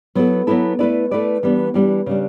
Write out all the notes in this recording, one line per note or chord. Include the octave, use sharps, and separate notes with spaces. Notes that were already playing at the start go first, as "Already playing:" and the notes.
F#3 B3 E4 A4
F#3 B3 E4 A4
A3 E4 B4 D5
A3 E4 B4 D5
E3 G3 B3 D4
E3 G3 B3 D4
C#3 G3 D4